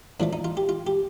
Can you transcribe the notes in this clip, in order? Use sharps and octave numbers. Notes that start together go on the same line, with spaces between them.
A2 F3 A3 D4
D#4
F4
G4
F4
G4